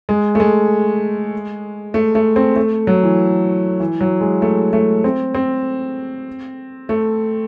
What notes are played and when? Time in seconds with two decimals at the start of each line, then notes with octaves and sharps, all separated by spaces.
0.09 G#3
0.35 A3
0.40 G#3
1.94 A3
2.15 A3
2.36 C4
2.56 A3
2.87 F#3
3.03 E3
3.80 E3
4.01 F#3
4.21 G#3
4.42 A3
4.73 A3
5.04 C4
5.35 C4
6.89 A3